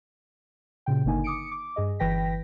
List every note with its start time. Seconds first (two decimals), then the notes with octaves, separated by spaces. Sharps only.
0.86 A#2 C#3 G5
1.05 G1 D3 A#3 D#4 G#5
1.24 D6 D#6 C#7 D7
1.51 D6
1.76 G2 G#4 D#5
1.99 G1 E3 B4 G5 A#6 B6